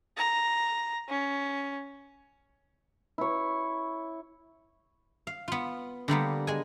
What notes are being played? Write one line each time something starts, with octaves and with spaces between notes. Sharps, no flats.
A#5
C#4
E4 C#5
F5
B3 F4
D3 G3 A#3 B3
G#3 G#5